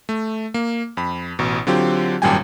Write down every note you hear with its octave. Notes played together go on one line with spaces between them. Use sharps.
A3
A#3
F2 B5
A1 B2
D3 F#3 C4 F4 G4
G#1 F#2 A#2 G3 G5 G#5